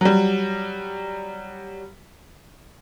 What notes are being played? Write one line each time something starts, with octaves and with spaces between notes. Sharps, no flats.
F#3 G3